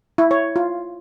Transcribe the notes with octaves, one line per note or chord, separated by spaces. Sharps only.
E4
C#5
F4